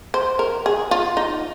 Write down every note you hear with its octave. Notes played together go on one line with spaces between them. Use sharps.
C5
A#4
G#4
F4
D#4